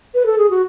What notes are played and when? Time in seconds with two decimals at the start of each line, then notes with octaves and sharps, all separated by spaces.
0.15 B4
0.26 A4
0.38 G#4
0.50 F#4